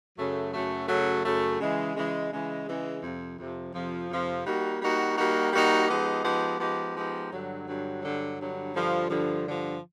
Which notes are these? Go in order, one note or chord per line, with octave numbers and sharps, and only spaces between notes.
F#2 C#3 F#3 A3
F#2 C#3 F#3 A3
F#2 C#3 F#3 A3
F#2 C#3 F#3 A3
C#3 E3 G#3
C#3 E3 G#3
C#3 E3 G#3
C#3 E3 G#3
F2 C3 F3
F2 C3 F3
F2 C3 F3
F2 C3 F3
G3 A#3 D#4 F#4
G3 A#3 D#4 F#4
G3 A#3 D#4 F#4
G3 A#3 D#4 F#4
F3 G#3 B3 D#4 G4
F3 G#3 B3 D#4 G4
F3 G#3 B3 D#4 G4
F3 G#3 B3 D#4 G4
G2 D3 F#3
G2 D3 F#3
G2 D3 F#3
G2 D3 F#3
G2 D3 F3
G2 D3 F3
G2 D3 F3